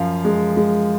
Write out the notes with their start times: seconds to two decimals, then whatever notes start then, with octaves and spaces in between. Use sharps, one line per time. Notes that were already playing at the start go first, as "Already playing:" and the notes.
Already playing: F#2 F3 F5
0.25 G#3
0.57 G#3